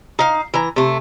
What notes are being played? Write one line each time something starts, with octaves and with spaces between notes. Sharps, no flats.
D#4 F5
E3 A#5
C3 A3